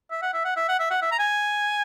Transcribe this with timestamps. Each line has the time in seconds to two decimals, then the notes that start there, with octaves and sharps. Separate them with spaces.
0.11 E5
0.22 F#5
0.34 E5
0.45 F#5
0.57 E5
0.68 F#5
0.79 E5
0.90 F#5
1.02 E5
1.12 A#5
1.19 G#5